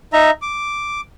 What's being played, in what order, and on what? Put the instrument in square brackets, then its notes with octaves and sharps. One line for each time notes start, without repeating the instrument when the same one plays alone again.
[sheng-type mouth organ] D#4 E5 A#5
D6